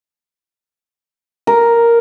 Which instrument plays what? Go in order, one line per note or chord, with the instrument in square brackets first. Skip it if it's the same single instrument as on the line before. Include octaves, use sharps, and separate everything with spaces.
[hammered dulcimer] A#4